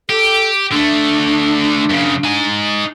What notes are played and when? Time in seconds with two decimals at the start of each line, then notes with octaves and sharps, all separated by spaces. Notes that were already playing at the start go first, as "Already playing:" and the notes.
0.10 G4 A4
0.72 D3 A3 D4
1.90 F#2 C#3
2.24 D#4 G#5